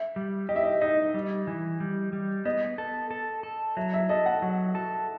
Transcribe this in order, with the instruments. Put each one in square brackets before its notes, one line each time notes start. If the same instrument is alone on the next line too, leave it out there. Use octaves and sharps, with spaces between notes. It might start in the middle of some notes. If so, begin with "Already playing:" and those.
Already playing: [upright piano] E5
[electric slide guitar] G3
[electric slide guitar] G4 [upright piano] D#5
[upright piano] E5
D#5
[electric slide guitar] D#4 [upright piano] D#5
[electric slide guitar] G3
E3
G3
G3
[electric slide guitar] B3 [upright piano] D#5
[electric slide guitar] A4
A4
A4
[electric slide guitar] F#3 [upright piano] E5
[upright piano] E5
[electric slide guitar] A4 [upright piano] D#5
[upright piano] F#5
[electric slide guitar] F#3
A4